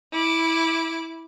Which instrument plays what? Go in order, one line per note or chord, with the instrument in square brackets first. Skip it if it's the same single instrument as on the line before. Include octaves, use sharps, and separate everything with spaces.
[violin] E4 D6